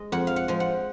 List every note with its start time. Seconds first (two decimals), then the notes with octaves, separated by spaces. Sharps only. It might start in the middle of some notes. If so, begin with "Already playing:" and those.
Already playing: G#3 D#5
0.12 F2 F#5
0.27 F5
0.36 F#5
0.48 F3 G#3
0.60 F#5